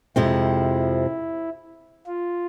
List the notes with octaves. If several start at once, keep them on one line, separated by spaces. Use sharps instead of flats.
F2 C3 F3 G#3 C4 E4
F4